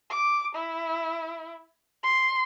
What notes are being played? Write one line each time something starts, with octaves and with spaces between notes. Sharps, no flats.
D6
E4
C6